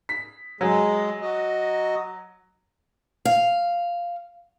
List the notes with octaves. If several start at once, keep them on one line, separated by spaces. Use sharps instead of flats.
B6
F#3 G#3 G#4
F#4 D#5
F5